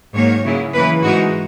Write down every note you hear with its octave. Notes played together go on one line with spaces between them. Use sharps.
G#2 D#3 F#3 A#3 C#5
C#3 F#3 A#3 E4
C#3 E3 A#3 B4
G#2 E3 G#3 D#4 F#4